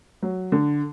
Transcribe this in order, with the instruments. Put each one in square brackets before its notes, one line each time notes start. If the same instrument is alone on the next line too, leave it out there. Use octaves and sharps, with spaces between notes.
[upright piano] F#3
D3